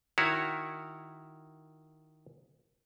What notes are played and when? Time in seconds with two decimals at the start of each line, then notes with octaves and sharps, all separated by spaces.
0.18 D#3 E4 F#4 C#5